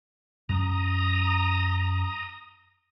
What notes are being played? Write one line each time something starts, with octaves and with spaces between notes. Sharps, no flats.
F#2 F#3 C#4 A#5 D#6